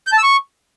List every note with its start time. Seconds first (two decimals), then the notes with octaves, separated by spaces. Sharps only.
0.07 G6
0.12 A5
0.18 E6
0.23 C#6